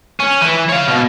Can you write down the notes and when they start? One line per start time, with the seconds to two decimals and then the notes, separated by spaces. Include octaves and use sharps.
0.20 C#4
0.42 E3
0.69 C#5 F5
0.88 B2